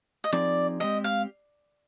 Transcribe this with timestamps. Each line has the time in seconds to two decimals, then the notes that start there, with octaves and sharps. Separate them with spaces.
0.24 D#5
0.33 F3 C4 D#4 G#4 D5
0.80 G#3 C4 G4 D#5
1.04 F5